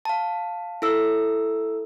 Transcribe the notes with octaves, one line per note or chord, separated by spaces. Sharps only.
F5 A5
E4 A4 E6